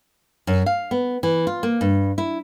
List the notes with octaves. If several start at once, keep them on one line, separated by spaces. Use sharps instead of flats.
F#2
F5
B3
E3
F4
A#3
G2
E4